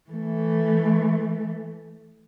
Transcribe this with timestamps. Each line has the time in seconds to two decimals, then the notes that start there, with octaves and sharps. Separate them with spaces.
0.10 E3 A3